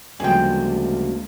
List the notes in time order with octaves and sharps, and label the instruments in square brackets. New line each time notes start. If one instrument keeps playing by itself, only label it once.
[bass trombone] D2 [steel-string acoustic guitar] C#3 F3 G3 [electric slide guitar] G#3 A#3 [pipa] G#4 G5